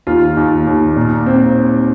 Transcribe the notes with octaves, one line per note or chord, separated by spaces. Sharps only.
D#2 F4
D#2
D#2
A#2
C4